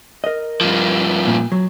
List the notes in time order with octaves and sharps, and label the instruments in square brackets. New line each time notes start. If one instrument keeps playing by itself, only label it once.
[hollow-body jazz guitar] A#4 D#5
[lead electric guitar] G2 F3
[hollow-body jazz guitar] A#2
F#3